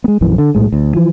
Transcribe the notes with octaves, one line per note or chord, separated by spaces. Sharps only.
G#3 B3
A#1 F#2 E3
D3
B1 A2 G#3
D2
E3 F3